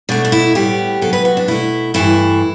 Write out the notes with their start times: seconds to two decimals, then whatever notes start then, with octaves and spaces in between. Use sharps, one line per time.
0.09 B2 A3 D4
0.25 D4
0.32 E4
0.55 A2 G3 B3 G4
1.01 C3 F#3 B3 A4
1.13 B4
1.25 F#4
1.37 D4
1.48 B2 A3 E4
1.94 G2 E3 A3 E4